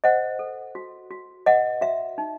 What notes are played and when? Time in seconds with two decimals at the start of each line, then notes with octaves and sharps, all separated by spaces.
0.04 C5 D#5 F#5
0.39 A4
0.75 F#4
1.11 F#4
1.46 B4 D#5 F#5
1.81 F#4 E5
2.18 D#4